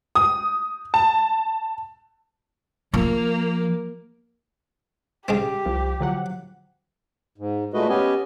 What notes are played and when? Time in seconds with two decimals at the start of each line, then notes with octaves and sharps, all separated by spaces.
0.15 D#6
0.94 A5
2.94 F3 A#3
5.28 C#3 G#3 C4 G4
5.66 C2 F3
6.00 D3 F3 F#3 F#5
7.38 G#2
7.74 A#2 G#3 A3 F#4 B4 D#5
7.89 B3 C#4 G4 B4 D#5 G#5